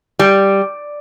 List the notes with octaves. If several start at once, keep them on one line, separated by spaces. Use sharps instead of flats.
G3